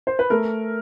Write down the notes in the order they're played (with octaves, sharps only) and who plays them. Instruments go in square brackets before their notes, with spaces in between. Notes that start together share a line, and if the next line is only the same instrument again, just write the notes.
[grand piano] C5
B4
A3 A#4